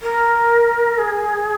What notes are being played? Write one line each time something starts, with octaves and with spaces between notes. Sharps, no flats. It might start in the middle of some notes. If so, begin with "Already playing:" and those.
A#4
G#4